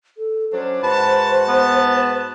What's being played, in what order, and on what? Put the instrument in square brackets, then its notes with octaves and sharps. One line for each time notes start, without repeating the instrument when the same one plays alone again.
[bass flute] A4
[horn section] F#3 C#4 D4 [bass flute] C5
[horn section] G#2 F#4 A5 [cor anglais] B4
[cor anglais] B3